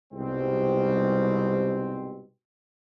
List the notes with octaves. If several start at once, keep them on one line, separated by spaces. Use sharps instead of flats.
C2 G#2 B2 G3 C4